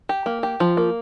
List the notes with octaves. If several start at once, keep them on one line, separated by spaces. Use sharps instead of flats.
G4
A#3
G4
F3
A#3